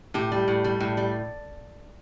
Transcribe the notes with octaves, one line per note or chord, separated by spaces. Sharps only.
A2 G4
G3
A2
G3
A2
G3